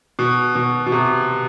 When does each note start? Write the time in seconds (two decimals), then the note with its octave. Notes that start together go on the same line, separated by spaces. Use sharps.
0.19 B2
0.55 B2
0.87 B2
0.92 C3